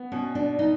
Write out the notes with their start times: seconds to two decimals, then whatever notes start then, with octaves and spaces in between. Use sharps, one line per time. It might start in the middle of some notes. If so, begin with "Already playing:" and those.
Already playing: B3
0.12 B2 C#4
0.35 D4
0.59 D#4